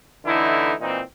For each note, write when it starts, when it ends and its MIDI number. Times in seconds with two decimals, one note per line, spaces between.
0.25 0.73 50
0.25 0.73 52
0.25 0.73 57
0.25 0.73 63
0.25 0.73 64
0.80 1.01 46
0.80 1.01 52
0.80 1.01 60
0.80 1.01 63